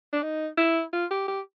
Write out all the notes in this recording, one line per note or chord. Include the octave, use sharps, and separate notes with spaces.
D4
D#4
E4
F4
G4
G4